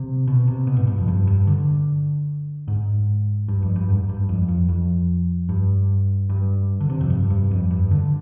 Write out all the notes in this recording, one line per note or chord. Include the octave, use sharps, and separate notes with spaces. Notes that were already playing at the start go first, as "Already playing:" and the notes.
Already playing: C3
B2
C3
B2
G#2
G2
F2
G2
G2
D3
G#2
G2
F2
G2
G#2
G2
F2
F2
F2
G2
G2
D3
C3
F2
G2
G2
F2
G2
D3